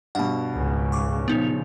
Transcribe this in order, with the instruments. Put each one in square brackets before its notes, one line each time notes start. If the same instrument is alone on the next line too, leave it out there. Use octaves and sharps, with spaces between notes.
[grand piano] G2 B2 [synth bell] F#5 B5
[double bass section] C#2 G#2 C#3
[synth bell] C#6 D6
[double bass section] A#2 C#3 F3 [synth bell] B3 D#4 F7